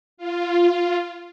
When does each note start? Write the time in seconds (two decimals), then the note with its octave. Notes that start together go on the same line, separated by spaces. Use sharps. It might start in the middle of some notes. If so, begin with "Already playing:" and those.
0.17 F4